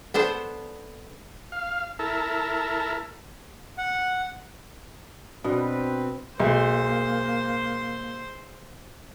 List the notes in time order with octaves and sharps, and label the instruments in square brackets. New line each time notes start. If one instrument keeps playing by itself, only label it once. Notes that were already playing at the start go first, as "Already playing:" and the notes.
[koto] B3 D4 A4 C5
[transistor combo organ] F5
E4 A4 A#4
[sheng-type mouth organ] F#5
[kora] B2 [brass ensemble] C4 B4 [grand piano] D4
[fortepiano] B1 [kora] G#3 [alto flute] A#3 [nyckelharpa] C5 C6